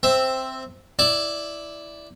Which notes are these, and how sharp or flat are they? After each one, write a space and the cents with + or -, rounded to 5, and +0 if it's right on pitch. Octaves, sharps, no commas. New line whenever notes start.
C4 +0 E5 +0
E4 +0 D5 +0